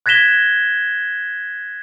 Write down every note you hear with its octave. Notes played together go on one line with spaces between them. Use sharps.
F#6 G#6 A#6 B6 E7 G7